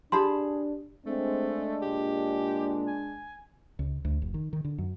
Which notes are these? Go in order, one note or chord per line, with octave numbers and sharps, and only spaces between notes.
D4 G4 G#4 A5 B5 C6
G#3 A3 C4 D4
A#2 G4
G#5
C#2
D2
F1
D#3
D#3
D3
F#2